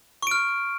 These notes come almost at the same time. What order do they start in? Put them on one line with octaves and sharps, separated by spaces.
C#6 D7 F6